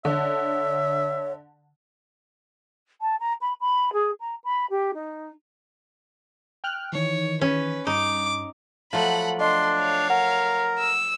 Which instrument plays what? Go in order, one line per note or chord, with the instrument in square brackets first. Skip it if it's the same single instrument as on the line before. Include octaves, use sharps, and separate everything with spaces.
[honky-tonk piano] D3 [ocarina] C#5 [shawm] E5
[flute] A5
A#5
B5
B5
G#4
A#5
B5
G4
D#4
[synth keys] G5 F6 F#6
[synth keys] D#3 E3 [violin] C#5
[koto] C#4 [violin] B4
[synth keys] G2 [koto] D#4 [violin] D6
[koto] F3 F#3 A3 [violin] F#5 B5
[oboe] D4 [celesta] D#5 [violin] C6
[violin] C#5 F5
[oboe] A#4 [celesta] F#5
[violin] E6